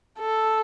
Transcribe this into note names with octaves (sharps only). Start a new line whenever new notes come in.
A4